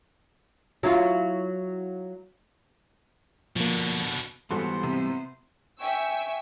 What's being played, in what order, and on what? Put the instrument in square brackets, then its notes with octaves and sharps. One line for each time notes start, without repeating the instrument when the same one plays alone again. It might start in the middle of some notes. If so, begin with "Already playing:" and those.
[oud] F#3 E4 F4
[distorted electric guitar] B2 D3 [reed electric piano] F3 A#3
[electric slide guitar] G#2 E3 G3 [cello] B3 C5 [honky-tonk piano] F#4 A4 C6
[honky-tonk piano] C3
[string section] E5 G5 G#5 C#6 E6